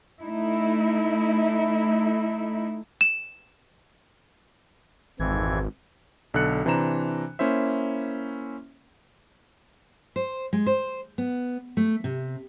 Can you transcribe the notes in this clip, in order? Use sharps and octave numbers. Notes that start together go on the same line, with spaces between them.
A3 D#4 E4
E7
G#1 F2 E3 G#6
B1 D3 A4 F#6 C#7
C3 E3 D4 C5 A#5 E7
A#3 C#4 E4 C5 E5
C5
G#3
C5
B3
A3
C3